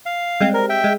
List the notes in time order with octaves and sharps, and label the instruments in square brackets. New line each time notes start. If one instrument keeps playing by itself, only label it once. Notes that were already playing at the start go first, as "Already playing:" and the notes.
[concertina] F5
[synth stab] G3 G#3 C4
[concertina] A#4
E5 G5
[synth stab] G#3